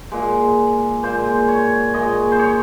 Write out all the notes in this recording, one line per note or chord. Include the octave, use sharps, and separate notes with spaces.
A#2 G#3
A#2 G#3 C5
C#5
A#2 G#3 D#5
C5
C#5